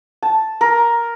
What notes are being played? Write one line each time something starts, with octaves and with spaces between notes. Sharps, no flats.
A5
A#4